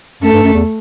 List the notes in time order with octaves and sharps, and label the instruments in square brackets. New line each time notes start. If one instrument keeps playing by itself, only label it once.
[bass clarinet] F#2 [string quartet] A3 A4
[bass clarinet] G2
F#2
E2